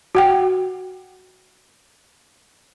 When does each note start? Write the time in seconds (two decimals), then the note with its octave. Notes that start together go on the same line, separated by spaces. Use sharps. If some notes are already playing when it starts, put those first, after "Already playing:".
0.15 F#4 F#5 G5